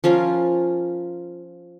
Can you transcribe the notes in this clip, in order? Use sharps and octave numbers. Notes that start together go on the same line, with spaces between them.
F3 C#4 F4 A#4